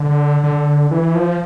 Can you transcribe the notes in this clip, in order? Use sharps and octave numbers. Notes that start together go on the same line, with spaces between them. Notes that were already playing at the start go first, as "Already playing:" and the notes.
Already playing: D3
D3
E3
F3